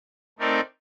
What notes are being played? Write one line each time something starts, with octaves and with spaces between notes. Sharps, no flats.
A3 C4 D#4 A#4 D5